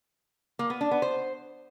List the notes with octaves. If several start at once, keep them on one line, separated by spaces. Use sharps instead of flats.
A#3
B3
D4
B3
C5